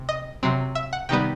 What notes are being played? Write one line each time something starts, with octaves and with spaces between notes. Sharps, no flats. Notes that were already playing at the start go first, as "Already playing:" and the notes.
Already playing: C3
D#5
C3 F#3 C4
E5
F#5
C3 D#3 G3 B3 G5